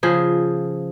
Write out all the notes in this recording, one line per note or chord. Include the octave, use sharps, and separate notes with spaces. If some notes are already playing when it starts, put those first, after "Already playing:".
C#3 F3 G#4